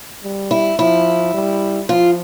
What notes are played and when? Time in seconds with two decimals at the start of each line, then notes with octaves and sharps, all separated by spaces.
0.23 G3
0.51 E4
0.79 F3 E4
1.34 G3
1.89 F3 F4